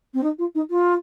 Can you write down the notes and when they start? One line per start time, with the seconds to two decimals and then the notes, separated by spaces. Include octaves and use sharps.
0.14 C4
0.23 D#4
0.38 F4
0.55 D#4
0.70 F4